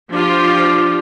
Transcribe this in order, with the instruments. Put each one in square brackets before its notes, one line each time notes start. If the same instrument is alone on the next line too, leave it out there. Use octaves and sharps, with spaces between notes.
[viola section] F3 F4 G4 [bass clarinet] D4